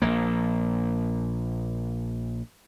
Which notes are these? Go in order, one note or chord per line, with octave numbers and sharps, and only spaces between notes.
A#1 A#3